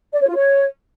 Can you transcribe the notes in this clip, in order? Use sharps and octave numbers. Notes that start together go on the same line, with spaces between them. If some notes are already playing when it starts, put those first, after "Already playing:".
D5
C#5
F4
C#5